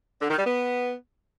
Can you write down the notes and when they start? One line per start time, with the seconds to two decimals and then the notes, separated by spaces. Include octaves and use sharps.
0.22 D3
0.30 D#3
0.38 G3
0.46 B3